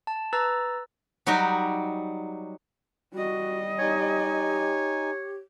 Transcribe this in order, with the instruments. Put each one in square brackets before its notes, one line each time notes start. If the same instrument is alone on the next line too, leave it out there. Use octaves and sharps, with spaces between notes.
[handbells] A5
B4 A#5 E6 A6
[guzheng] F#3 G3 D#4 F#4 G4
[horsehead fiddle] G3 D#5 [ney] F#4
[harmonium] D#4 G#5 [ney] G4 [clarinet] C#5